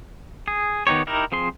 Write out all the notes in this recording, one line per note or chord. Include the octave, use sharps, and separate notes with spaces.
G#4
D#3 B3 D#4 G4 C#5
D#4 E4 G4 A#4
F3 C4 G#4 C6